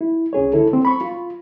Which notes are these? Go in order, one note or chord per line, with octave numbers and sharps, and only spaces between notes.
E4
C2 C#4 G#4 C#5
D3 E4 A4
C4
B5 C#6
F4